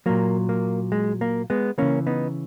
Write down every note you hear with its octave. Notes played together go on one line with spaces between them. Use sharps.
A#2 F#3 A#3
A#3
G#3
A#3
G#3 B3
C#3 E3 A#3 C#4
B3 D#4